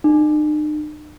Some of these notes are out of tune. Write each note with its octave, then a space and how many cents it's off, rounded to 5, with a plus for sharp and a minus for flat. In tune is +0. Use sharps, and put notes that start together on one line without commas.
D#4 -45